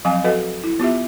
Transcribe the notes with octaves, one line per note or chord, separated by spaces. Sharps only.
F3 F#3 C4 F5 G#5
F#4 A4 B4 D#5 F#5
E4
B3 F4 G4 E5